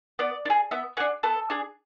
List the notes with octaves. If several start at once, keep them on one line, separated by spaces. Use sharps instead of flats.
B3 D5
D4
G#4
B3 E5
D4 G#4 F#5
B3 A4
D4 G#4